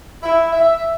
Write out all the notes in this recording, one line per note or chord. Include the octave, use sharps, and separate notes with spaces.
E4
E5